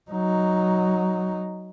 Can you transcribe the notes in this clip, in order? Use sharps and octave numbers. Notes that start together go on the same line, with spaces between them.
F#3 D#4